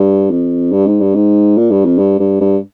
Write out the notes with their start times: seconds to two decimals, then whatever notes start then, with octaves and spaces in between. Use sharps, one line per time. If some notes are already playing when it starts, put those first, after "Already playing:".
Already playing: G2
0.30 F2
0.72 G2
0.87 G#2
1.01 G2
1.15 G#2
1.57 A#2
1.71 G2
1.85 F2
1.98 G2
2.19 G2
2.41 G2